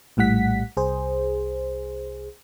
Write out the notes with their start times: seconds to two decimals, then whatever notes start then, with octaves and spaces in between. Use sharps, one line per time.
0.17 A#1 A2 G3 F#5 B6
0.77 C2 G#4 C5